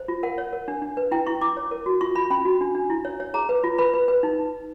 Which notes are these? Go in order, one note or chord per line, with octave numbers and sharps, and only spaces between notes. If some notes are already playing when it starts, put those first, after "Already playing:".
Already playing: C5
F4
A#4 F#5
C#5
A#4
D4
D4
B4
E4 G5
E4 C#6
E4 D6
C#5
A#4
F#4
F4 C#6
F4 B5
C#4 B5
F#4
D4
D4
E4
C#5
C#5
G#4 A#5
B4
F4
B4 B5
B4
B4
D#4